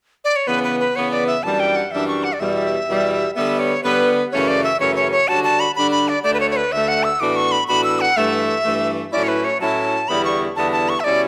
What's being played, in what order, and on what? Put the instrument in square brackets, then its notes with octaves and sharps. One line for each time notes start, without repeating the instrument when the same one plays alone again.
[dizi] D5
C#5
[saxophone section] C#3 E3 B3 [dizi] B4
[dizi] B4
B4
[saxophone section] C#3 E3 B3 [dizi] C#5
[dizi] D5
E5
[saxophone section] F#2 E3 G3 D4 [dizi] A5
[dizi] G5
F#5
[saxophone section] F#2 E3 G3 D4 [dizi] E5
[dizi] C#6
F#5
D5
[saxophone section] E2 B2 G3 [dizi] E5
[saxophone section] E2 B2 G3
[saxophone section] D3 G3 B3 [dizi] E5
[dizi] C#5
[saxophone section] D3 G3 B3 [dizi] B4
[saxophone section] F#2 C#3 E3 A3 C#4 [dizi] C#5
[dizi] D5
E5
[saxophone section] F#2 C#3 E3 A3 C#4 [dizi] C#5
[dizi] C#5
C#5
[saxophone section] D3 G3 D4 F#4 [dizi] A5
[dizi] A5
B5
[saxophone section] D3 G3 D4 F#4 [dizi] B5
[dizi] B5
D5
[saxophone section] D2 D3 A3 [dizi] D5
[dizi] B4
C#5
C#5
B4
[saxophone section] D2 D3 A3 [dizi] E5
[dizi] F#5
E6
[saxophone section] A2 E3 B3 D4 F#4 [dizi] D6
[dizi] C#6
B5
[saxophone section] A2 E3 B3 D4 F#4 [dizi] B5
[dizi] E6
F#5
[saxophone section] G2 E3 A3 [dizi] E5
[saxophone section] G2 E3 A3
[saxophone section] A2 F#3 C#4 E4 [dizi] D5
[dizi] C#5
B4
C#5
[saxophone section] A2 F#3 C#4 E4 [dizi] A5
[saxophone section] E2 D3 G3 B3 E4 [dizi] B5
[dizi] C#6
[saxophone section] E2 D3 G3 B3 E4 [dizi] A5
[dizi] A5
C#6
E5
[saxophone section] B2 G3 C#4 E4 [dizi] D5